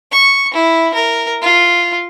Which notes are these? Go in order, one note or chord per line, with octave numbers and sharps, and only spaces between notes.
C#6
E4
A#4
F4